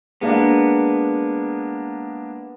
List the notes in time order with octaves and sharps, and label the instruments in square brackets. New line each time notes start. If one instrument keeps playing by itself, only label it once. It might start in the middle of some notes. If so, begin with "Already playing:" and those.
[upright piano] G#3 A#3 D4 [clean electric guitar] B3